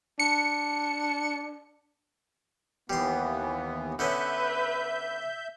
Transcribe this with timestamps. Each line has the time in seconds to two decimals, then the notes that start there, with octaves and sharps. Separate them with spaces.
0.19 D4 C#7
2.90 D#2 E3 G3 B3 C6
3.99 D3 B3 C#4 B4 E5 G6